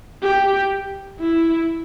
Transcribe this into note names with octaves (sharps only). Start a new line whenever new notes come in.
G4
E4